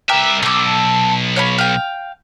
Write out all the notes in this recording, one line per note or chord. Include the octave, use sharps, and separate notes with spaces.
C2 G4 A#4 B4 E5
B1 A4 D6
C#5 F5 B5
F5 G5